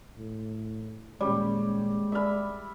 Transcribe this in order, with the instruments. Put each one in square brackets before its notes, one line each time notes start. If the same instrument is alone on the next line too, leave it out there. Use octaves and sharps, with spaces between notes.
[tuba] A2
[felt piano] D#1 C#4 C#5 [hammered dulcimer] G3 [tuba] G#3
[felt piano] D5 F6 [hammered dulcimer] E5 B5